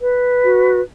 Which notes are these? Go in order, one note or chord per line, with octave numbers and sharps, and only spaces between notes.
B4
F#4